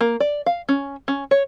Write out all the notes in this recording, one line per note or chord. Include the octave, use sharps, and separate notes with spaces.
A#3
D5
F5
C#4
C#4
C#5